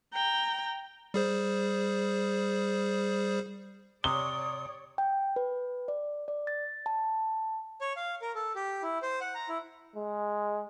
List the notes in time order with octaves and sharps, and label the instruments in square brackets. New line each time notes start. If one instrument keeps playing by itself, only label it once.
[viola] G5 A#5
[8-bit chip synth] G3 G#4 C5
[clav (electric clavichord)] C3 [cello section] C#5 D5 [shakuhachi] D#6 [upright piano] G7
[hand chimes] G5
B4
D5
D5
A6
A5
[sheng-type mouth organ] C#5
F5
A#4
A4
G4
E4
C5
F#5
A#5
E4
[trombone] G#3